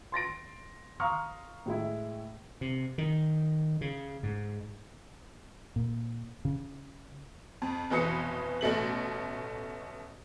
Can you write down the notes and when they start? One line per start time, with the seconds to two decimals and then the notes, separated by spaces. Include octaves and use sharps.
0.12 C6 A6 A#6 D7
1.00 F5 A#5 C6 C#6 D#6 F6
1.66 A2 G#3 E4
2.61 C3
2.98 D#3
3.81 C#3
4.23 G#2
5.76 A#2
6.45 C#3
7.62 F2
7.90 F1 B2 E3 B4 D#6 C#7
8.61 A1 B2 A3 F#7